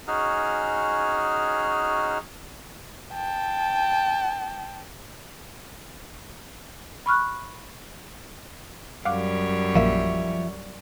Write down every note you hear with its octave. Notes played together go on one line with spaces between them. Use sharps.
C#4 D#4 F#4 G#4 F6
G5 A5
B5 C#6 F6 F#6
F#2 G3 C#5 F5 F#5 D6
A#1 F3 A#3 E5